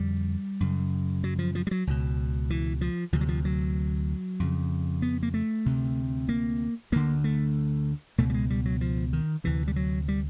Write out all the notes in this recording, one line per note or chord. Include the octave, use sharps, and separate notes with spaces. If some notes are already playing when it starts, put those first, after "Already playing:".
Already playing: F2 D3 G3
F#2 C#3
F#3
F3
F3
G3
F#3
C#2 B2
E3
F3
D2 C3 F3
F#3
F3
F#3
F2 C#3
B3
A#3
A3
D2 C3
A#3
D2 D3 A#3
A3
C#2 B2 A3
G3
G#3
G3
F#3
F3
D#3
D2 C3 E3
G3
F#3
G3